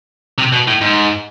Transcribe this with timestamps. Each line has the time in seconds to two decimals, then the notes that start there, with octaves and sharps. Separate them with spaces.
0.38 C3
0.52 B2
0.68 A2
0.81 G#2